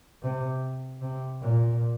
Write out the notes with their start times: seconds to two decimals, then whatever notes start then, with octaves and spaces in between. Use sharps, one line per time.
0.22 C3
1.02 C3
1.41 A#2